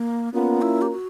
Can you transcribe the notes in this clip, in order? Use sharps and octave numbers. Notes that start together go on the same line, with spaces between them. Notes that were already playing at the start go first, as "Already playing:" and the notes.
Already playing: A#3
A#3 B3 C#4 F4 A#4
E4
G4
F#4